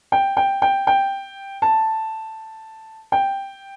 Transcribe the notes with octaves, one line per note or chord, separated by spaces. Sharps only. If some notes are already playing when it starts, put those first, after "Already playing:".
G5
G5
G5
G5
A5
G5